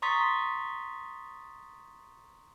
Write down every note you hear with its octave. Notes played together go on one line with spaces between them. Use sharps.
A#5 C6 C#6 D#6 A6 B6